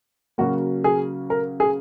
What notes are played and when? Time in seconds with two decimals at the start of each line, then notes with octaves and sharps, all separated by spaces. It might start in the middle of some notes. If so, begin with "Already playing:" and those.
0.38 C#3 F#3 A#3 F#4
0.84 G#4
1.30 A#4
1.60 G#4